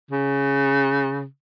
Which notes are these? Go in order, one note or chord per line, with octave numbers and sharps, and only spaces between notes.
C#3